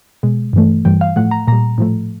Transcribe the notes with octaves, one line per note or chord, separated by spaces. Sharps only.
B2 G#3
G2 E3 A3
G2 E3 G3 G5
F5
A2 F3 A3 F#5
A#5
A#2 G3 A#5
A2 F3 A3